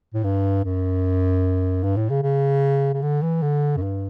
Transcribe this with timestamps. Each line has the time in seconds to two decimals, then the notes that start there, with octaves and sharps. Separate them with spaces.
0.14 A2
0.24 G2
0.64 F#2
1.83 G2
1.97 A2
2.10 C#3
2.23 C#3
2.94 C#3
3.02 D3
3.22 E3
3.42 D3
3.77 F#2
3.82 G2